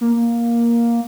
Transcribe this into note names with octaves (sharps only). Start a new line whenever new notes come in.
A#3